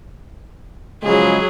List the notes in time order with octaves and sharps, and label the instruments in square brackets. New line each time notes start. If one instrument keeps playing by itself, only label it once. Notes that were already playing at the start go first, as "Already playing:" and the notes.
[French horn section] C#3 F3 G#3 [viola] F#3 G#4